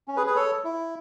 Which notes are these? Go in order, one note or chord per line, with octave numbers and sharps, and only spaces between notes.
C#4
G#4 B4
G#4 B4
A4 C#5
E4